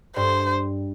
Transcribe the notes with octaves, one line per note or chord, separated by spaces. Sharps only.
G2 C5